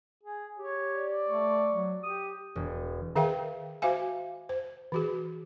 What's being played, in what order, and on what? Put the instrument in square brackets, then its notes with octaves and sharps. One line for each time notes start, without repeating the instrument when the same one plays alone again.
[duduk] G#4
[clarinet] G4 [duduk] C#5
[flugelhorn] D5
[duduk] A3 [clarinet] C#6
[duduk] F#3
[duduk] G4 [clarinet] D#6
[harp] E1
[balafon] D#3 G#4 A#4 E5 F5 G5
F#4 C5 E5 F5 G#5
C5
E3 F#4 G#4